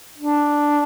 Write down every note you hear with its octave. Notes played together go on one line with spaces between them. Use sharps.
D4